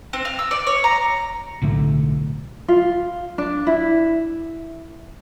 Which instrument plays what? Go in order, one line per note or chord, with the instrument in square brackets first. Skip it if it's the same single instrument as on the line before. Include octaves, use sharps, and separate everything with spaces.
[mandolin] C4
F5
E6
D5
C#5
A#5
[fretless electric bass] B1 A2 D3 A3
[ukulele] F4
D4
E4